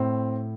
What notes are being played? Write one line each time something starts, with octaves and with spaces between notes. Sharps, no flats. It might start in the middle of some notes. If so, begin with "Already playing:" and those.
Already playing: A2 C4